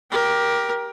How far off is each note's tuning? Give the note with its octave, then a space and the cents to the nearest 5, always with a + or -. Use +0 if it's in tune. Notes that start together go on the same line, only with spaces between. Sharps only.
G4 +0 A#4 +20